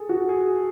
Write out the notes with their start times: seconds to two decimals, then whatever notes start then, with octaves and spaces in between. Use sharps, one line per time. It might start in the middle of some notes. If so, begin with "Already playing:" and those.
Already playing: G#4 A4
0.09 F#4
0.29 G#4